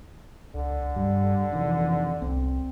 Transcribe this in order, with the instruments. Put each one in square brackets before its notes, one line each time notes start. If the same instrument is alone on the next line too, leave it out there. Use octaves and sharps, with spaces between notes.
[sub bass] C#2 [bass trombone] D3
[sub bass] G2 [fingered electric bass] G3
[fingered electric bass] F2 C3 D#3 [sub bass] E3
[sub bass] C2 [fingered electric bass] C4